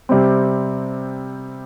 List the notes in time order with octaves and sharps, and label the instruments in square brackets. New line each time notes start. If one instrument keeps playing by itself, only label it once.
[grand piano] C3 G3 C4